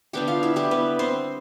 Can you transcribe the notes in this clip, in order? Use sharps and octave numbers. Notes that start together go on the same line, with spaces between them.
D3 G3 B3 D4 G4 G5
F4 F5
E4 E5
G3 G4
B3 B4
C4 C5